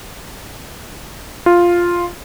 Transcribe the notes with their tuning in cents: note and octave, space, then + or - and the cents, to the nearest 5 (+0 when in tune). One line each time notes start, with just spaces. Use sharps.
F4 +0